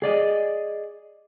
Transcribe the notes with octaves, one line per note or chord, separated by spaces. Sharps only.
G#4 D5 D#5